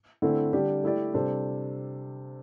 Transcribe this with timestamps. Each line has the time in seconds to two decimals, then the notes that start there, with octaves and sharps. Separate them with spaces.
0.22 D3 A3 C4 E4 A4
0.53 D3 G3 D4 G4
0.83 A3 E4 G4 D5
1.14 C3 G3 D4 A4 C5